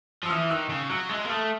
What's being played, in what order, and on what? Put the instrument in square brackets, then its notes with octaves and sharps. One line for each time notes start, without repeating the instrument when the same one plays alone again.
[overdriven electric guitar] F3
[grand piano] E6
[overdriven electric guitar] E3 [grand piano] D#6 F6
[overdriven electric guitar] D#3 [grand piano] E6 F#6
[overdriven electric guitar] C#3
[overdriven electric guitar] F#3 [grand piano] E6 F#6
[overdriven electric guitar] G#3 [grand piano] E6 F#6
[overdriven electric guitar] A#3
[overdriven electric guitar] A3 [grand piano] D#6 F6